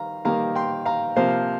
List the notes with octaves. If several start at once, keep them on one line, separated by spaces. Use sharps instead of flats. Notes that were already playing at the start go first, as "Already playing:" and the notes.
Already playing: D#3 G3 F5 A#5
D#3 G3 A#3 F5 A#5
G5 C6
F5 A#5
C3 F3 A#3 C5 F5